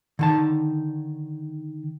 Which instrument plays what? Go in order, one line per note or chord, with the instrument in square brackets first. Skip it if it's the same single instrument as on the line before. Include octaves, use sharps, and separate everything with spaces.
[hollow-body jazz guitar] D3 D#3 A5